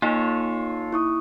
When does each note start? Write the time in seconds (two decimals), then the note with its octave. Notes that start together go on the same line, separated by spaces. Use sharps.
0.02 A#3 D#4 F4 A4 C#5
0.93 E4 C#6 D#6